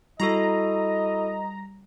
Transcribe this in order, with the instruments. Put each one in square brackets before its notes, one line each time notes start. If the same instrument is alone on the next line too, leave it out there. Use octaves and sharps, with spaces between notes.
[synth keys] G3 [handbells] E4 F#4 A4 [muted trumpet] D#5 [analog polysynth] A#5